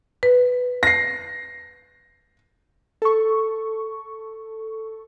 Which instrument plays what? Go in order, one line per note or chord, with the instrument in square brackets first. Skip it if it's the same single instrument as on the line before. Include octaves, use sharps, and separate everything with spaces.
[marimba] B4
[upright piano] A#6 C7
[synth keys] A4 C#6